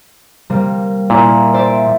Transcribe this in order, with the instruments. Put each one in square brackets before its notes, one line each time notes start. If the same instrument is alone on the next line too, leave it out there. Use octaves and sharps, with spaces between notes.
[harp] C3 G3 A#3
[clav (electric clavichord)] A#2 [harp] A#3 E4
[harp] C5 D5 E5